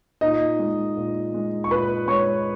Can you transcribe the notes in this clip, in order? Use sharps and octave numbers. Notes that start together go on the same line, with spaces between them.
A#2 D#4 D#5
G#3
A#2
G#3
C#6
A#2 B4 B5
G#3 C#5 C#6